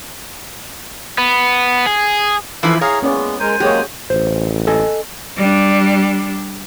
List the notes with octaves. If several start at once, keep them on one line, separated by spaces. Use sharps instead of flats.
B3
G#4
E3 F3 E4 A4 B4 F5
G#4 C#5 F5 A#5
G#3 A#3 B3 C#4 D5
G#3 A#4 C5 G#5
F#3 G#3 A#3 C#4 G4 G#4 C#5
A1 C5
A4 D#5 G#5
G3 D4